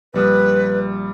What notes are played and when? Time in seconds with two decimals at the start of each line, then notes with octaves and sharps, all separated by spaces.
0.14 A#1 G3 B4 D#6